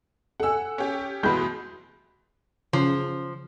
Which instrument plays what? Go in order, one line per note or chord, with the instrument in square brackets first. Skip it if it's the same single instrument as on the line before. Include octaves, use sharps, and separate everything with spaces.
[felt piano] A4 G#5 [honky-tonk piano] F#5 E6
[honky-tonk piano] C#4 G4
[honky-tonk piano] B2 E3 G#3 [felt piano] B5 G6
[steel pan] C#3 [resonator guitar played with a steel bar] F3